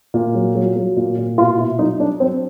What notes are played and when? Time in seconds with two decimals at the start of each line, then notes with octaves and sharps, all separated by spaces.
0.14 A#2
0.34 F#3
0.55 F#3
0.76 F#3
0.97 A#2
1.17 A#2
1.38 B2 F4
1.58 B2 E4
1.78 F#3 D#4
2.00 F#3 D4
2.20 F#3 C4